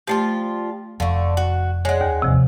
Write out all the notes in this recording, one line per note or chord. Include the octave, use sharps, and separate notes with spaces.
F3 G3 A3 F4 G4
F1 F2 D3 A3 F5 C#6
F#4
G#3 C#5 D5 F#5
D#2
G1 E2 C3 F3 C4